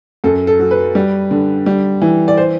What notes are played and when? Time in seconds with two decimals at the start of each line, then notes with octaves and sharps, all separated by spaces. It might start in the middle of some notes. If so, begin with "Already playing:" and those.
0.24 F#2 A4
0.47 A4
0.59 F#3
0.71 B4
0.95 G3
1.31 D3
1.66 G3
2.02 E3
2.28 D5
2.37 C5